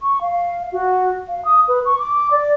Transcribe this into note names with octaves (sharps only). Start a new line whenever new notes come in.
C#6
F5
F#4
F5
D#6
B4
C#6
D6
D5